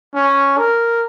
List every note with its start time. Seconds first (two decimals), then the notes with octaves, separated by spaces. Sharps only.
0.15 C#4
0.59 A#4